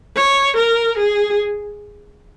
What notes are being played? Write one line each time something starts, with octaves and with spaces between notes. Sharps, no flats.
C#5
A#4
G#4